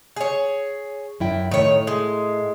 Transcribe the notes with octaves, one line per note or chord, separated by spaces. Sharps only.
G#4 C#5
F#2 E4 G5
A2 D#3 C#5
G#3